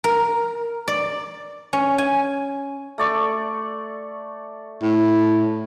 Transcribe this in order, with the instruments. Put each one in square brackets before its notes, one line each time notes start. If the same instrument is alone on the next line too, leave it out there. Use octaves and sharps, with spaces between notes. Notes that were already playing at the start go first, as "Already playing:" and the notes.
[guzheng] A#4
D5
C#4
G#5
[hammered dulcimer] A3 D5 C#6
[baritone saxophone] A2